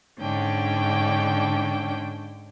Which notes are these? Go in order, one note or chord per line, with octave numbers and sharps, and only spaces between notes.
G#2 D3 C#4 D4 G5